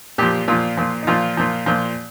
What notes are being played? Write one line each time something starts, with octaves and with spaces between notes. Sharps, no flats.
A#2 F3 G4
A#2 F3 F4
A#2 F3
D#4
A#2 F3 F4
A#2 F3
A#2 F3